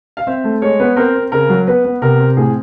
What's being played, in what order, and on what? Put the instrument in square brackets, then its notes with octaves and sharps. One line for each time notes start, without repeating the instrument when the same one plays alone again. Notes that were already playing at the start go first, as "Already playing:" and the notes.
[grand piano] F5
C4 E5
A3
G#3 C#5
B3
C4 A#4
C4
C#3 A#4
F#3
B3 B4
B3
C3 A#4
C4
A2 G#4